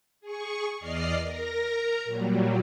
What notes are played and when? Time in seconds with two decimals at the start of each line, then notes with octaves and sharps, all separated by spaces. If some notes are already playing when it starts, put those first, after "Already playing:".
0.21 G#4 C#6
0.79 E2 D5 D#5 F6 C7
1.21 A#4 A#5
2.05 A#2 F#3 G3